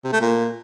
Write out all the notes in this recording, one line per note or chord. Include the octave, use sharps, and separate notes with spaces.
C3
A3
A#2